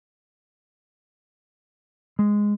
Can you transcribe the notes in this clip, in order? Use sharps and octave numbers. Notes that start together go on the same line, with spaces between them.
G#3